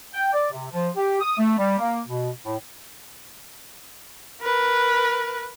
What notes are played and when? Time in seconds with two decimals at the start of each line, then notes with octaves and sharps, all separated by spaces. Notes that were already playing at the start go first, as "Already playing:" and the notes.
0.13 G5
0.33 D5
0.51 C3
0.71 F3
0.96 G4
1.20 D#6
1.38 A3
1.58 G3
1.78 A#3
2.06 B2
2.44 A2
4.42 A#4 B4